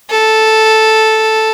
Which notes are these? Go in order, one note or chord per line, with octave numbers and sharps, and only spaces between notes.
A4